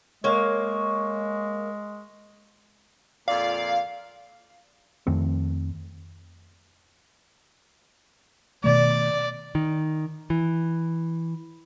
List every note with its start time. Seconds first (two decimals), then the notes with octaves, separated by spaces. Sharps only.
0.24 G#3 A#3 C#5
3.28 F2 A#2 D5 F5
5.07 F2 D#3 A3 C4
8.64 B2 D#3 A3 D5
9.55 D#3
10.30 E3